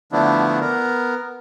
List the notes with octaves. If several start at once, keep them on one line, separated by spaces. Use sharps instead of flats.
D3 F3 A3 B3 D4 E4
B3 A#4